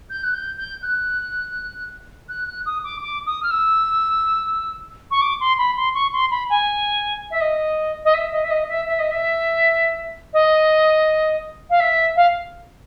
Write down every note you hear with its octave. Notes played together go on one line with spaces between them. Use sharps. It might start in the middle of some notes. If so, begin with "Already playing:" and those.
G6
F#6
G6
G6
F#6
F#6
F#6
D#6
D6
D6
D#6
F6
E6
C#6
D6
C6
B5
C6
C#6
C6
B5
G#5
E5
D#5
D#5
E5
D#5
E5
D#5
E5
E5
D#5
E5
D#5
F5
E5
F5